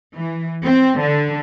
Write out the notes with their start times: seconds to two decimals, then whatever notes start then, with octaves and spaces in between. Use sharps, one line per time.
0.15 E3
0.63 C4
0.99 D3